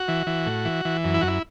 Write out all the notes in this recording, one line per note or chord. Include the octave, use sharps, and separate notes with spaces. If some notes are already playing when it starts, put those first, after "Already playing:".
Already playing: F#4
E3
E3
A2
E3
E3
F#2
E4
F#2 F#4
E4